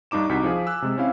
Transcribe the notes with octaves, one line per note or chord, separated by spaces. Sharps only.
G2 D4 D#4 D6 E7
C2 D#4 F#4 B6
F3 G#4 F5
G#5 E6 F#6
C3 G#3
C4 C#4 E4 F5